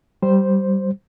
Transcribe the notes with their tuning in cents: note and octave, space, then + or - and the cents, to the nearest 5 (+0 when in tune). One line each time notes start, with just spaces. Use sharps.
G3 -15 C5 +0